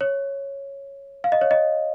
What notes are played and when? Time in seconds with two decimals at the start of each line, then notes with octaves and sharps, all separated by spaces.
0.01 C#5
1.24 F5
1.32 D#5
1.41 C#5
1.51 D#5